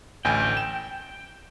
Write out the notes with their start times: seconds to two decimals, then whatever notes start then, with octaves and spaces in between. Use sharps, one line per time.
0.25 A1 D2 G5 G#5
0.57 E7